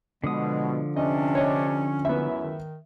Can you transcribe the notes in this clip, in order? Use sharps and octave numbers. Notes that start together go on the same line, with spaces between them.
B2 D3 F3 G#3 D#6
C3 C#4 D4 D#5
C#5 D#5
C#2 F#2 B3 E4 E5
D#3